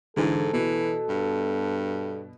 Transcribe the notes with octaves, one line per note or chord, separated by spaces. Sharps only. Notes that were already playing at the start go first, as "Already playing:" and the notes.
G#2 D3 E3 A4
B2 E3
G2